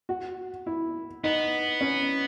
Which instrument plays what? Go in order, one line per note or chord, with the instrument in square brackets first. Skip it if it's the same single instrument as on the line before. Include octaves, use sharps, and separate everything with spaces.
[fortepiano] F#4
E4
[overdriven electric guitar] B3 [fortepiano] D#4
[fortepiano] C#4